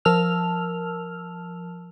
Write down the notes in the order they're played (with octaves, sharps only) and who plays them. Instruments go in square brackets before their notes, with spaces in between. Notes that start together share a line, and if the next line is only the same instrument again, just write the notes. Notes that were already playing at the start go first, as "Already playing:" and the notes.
[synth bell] F3 A#4 A5 E6 F6 F7